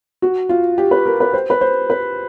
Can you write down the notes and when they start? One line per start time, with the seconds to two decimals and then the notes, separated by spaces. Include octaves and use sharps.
0.22 F#4
0.49 F4
0.78 G4
0.91 B4
1.06 A#4
1.20 B4
1.33 C5
1.50 B4
1.61 C5
1.90 B4